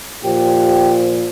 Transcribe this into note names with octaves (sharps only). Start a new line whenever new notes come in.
A#2 F3 G4